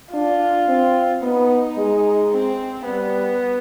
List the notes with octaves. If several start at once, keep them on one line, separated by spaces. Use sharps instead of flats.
D4 F4
C4
B3 D#4
G#3
C4
G3 B3